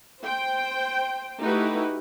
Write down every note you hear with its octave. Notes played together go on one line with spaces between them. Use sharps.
C5 G5
A3 D#4 E4 F#4 G4 B4